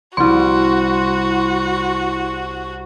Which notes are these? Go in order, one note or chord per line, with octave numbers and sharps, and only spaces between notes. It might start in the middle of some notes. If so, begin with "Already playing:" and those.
C2 E4 F#4 C6